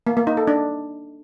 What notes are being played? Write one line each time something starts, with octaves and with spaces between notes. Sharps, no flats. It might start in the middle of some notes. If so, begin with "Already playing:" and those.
A#3
A#3
D#4
A4
D4